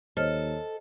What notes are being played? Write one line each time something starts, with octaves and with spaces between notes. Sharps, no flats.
D#2 F#3 A4 C5 D#5 F6